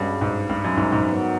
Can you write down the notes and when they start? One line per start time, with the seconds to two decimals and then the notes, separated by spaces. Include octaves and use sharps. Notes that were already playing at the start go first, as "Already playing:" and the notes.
Already playing: G2 B2 G#3 C#4
0.21 G#2
0.49 G2
0.64 F#2
0.77 G#2
0.92 G#2
1.06 D#3 F#3 B3